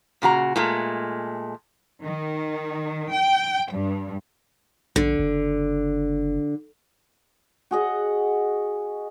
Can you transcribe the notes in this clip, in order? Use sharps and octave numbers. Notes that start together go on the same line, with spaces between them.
A#2 C#3 F#4 A#5
A#2 G#3 A3
D#3
G5
G2
A#1 D3
F#1
F#4 G#4 D#5 F#5